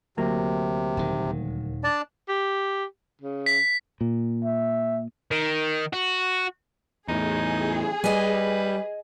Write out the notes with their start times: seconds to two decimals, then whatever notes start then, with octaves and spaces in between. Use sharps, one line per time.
0.17 D2 C3 F#3 A#3
0.97 D#1 D#3
1.84 D4 D5 A5
2.29 G4
3.21 C#3
3.46 B6
4.01 A#2
4.44 E5
5.31 D#3
5.93 F#4
7.08 E2 A2 D#4 G#4
8.04 G3 B4 D#5 G#5